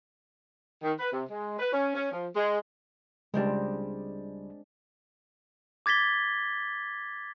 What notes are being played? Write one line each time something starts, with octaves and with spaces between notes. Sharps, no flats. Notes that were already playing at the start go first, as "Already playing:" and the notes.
D#3
B4
C3
G#3
B4
C#4
C#4
F3
G#3
C#2 G3 G#3 C4 D4
D6 G#6 A6 B6 G7